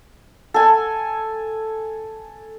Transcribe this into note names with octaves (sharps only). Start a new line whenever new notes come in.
A4 G#5